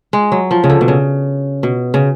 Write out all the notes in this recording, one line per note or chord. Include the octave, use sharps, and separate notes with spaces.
G#3
F#3
F3
C#3
D3
B2
C#3
B2
C#3